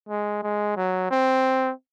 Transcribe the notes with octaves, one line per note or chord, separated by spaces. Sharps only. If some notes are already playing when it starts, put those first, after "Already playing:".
G#3
G#3
F#3
C4